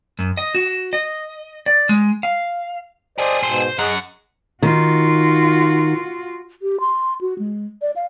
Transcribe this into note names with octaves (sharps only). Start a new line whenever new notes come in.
F#2
D#5
F#4
D#5
D5
G#3
F5
G4 G#4 C5 D5 D#5
G#2 B2 C5
F#2 G#4 D#5 F#5
D#3 F4 F#4
G4
C6
F#4
G#3
D5
F5